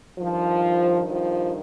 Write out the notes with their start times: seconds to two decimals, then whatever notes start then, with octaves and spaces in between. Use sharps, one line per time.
0.18 G2 D#3 F3
1.09 F3